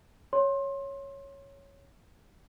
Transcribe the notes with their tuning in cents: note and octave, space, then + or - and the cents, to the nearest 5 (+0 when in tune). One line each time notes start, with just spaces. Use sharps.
C#5 +0 C6 +25